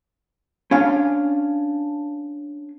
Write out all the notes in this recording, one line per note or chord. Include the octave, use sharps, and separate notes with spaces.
C#4 D4 F5